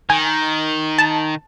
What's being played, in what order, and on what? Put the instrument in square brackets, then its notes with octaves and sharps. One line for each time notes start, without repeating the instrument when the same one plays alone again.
[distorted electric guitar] D#3 [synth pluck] G#5
[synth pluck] A5